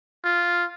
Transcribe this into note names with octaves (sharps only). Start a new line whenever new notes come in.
F4